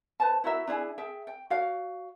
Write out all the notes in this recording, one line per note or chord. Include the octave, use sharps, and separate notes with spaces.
B4 C5 A5
E4 F#4 A#4 E5
D4 E4 G#4 G#5
G#4 E5 G5
G5
F#4 C#5 F5